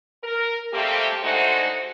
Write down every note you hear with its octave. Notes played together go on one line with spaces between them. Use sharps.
A#4
C3 G3 A3 A#3 C4 G4
D3 G#3 A3 D#4 F#4 C5